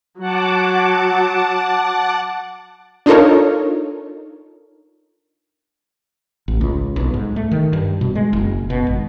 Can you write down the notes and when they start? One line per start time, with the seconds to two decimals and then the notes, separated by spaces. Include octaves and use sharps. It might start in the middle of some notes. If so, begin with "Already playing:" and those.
0.19 F#3 F#5 A5 D6
3.06 D4 D#4 F4 A4 A#4 C#5
6.48 A1
6.61 C#2
6.96 B1
7.14 G#2
7.36 A3
7.51 D#3
7.73 G2
8.01 B2
8.15 G#3
8.33 F#1
8.70 B2
8.87 G#1